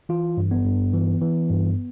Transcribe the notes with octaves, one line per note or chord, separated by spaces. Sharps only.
E3 F4
G2
B3
G2
E3
E3
G2